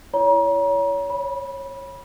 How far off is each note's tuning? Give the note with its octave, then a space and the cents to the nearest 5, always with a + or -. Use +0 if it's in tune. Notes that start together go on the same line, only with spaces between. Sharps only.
E4 +25 C#5 +30 A#5 +35
C#5 -25 B5 -20